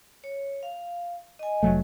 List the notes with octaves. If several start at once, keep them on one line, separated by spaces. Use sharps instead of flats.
C#5
F5
D#5 G#5
F1 F#3 A3